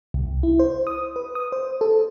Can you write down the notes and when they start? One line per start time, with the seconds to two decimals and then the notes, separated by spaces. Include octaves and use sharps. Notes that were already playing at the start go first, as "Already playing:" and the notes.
0.14 C2
0.43 E4
0.59 C5
0.87 D#6
1.16 B4
1.35 D#6
1.52 C5
1.81 A4